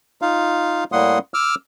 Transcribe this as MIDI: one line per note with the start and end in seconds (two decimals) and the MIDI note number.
0.22 0.84 63
0.22 0.84 65
0.22 0.84 77
0.92 1.19 45
0.92 1.19 55
0.92 1.19 58
0.92 1.19 78
0.92 1.19 84
0.92 1.19 87
1.34 1.55 86
1.34 1.55 88
1.34 1.55 89